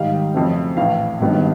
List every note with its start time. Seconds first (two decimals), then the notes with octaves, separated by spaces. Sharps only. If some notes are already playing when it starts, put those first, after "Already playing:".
Already playing: G#2 D#3 G3 F5
0.34 F2 C#3 F#3 A3 C4
0.77 A#1 A2 E3 F5
1.20 G#1 G2 D#3 F#3 B3